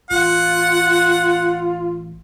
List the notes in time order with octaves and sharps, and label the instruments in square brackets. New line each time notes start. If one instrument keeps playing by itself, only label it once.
[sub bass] A1 [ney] F4 [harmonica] F#5